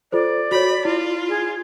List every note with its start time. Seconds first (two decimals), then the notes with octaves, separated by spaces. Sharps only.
0.12 F4 A4 C5 D5
0.51 F#4 C#5 B5
0.85 E4 F4
1.29 G#4